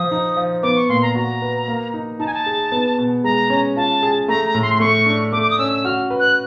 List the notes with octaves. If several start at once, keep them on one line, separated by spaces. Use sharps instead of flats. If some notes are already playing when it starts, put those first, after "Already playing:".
Already playing: F3 D#6
D#4
F3
B3 D6
C#6
A#2 C6
A#5
F#4 A#5
B4
A#3
D#4
D#4 A5
G#5
A5
G#4
B3
B2
G#3 A#5
C#4
F4 A5
G#4
A3 A#5
A#5
A2
C6
C6
A3 C#6
D4
A3 D6
D6
D#6
C#4 E6
E6
F#4 F6
B4
F#6